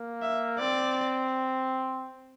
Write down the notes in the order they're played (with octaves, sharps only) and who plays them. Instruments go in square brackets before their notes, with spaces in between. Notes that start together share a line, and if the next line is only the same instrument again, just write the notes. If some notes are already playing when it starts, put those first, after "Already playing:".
Already playing: [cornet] A#3
[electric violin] E5
[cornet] C4 [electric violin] D5